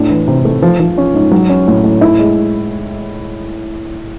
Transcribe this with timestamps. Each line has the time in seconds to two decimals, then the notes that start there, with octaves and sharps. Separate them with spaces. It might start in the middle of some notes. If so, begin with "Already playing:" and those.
Already playing: A2 D4
0.09 E3
0.28 C3
0.45 A3
0.62 F3
0.80 F3
0.98 C#4
1.14 G#2
1.31 F#3
1.49 C#4
1.68 A2
1.84 A2
2.01 E4
2.19 G#3